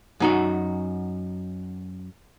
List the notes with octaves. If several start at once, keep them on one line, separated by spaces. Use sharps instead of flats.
F#2 D#4 F#4